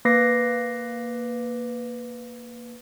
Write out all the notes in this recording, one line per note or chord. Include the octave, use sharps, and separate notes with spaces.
A#3 B4 D6 A#6 C7